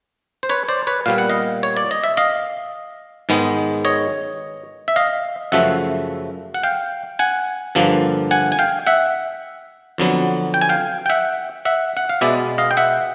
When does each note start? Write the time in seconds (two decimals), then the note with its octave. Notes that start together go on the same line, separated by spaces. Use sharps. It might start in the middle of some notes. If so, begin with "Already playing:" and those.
0.43 C5
0.49 B4 C#5
0.68 C5 D5
0.87 B4 C#5
1.06 A#2 G3 B3 F5
1.18 F#5
1.29 D#5 F5
1.63 C#5
1.77 D5
1.91 D#5
2.04 E5
2.17 D#5 F5
3.29 G#2 D#3 G#3 B3
3.85 C#5 D#5
4.88 E5
4.96 D#5 F5
5.52 F#2 C#3 F3 A3 E5 F#5
6.54 F#5
6.63 F5 G5
7.19 F#5 G#5
7.75 G2 D3 F3 A#3
8.31 F#5 G#5
8.52 G#5
8.59 F5 G5
8.87 E5 F#5
9.98 F2 D3 F#3 B3
10.54 G5
10.61 G#5
10.69 F5 G5
11.06 G5
11.10 E5 F#5
11.65 E5 F#5
11.97 F#5
12.09 F5
12.21 B2 G#3 B3 D5 E5
12.58 D#5 F5
12.71 G5
12.77 E5 F#5